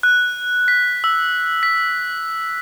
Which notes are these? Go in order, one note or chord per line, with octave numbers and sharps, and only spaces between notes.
F#6
B6
E6
B6